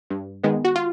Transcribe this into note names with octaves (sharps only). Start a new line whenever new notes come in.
G2
D#3 G#3 B3
F#4
F4